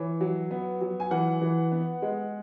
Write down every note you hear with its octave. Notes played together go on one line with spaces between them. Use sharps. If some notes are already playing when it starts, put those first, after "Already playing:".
Already playing: E3 C#5
F#3
B3
F#3
G#5
E3 F#5
E3
B3
G#3